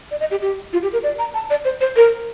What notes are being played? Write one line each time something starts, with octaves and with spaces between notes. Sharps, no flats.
D5
D#5
G4
G4
F4
G4
A#4
D5
A#5
A5
D5
C5
C5
A#4